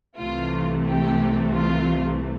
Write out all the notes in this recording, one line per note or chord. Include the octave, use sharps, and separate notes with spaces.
C2 C3 E3 A3 F4
G4
F4